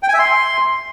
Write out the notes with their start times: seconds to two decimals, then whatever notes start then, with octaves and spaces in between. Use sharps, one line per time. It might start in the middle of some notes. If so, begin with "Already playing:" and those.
0.03 G5
0.08 G#5
0.14 E5
0.19 C6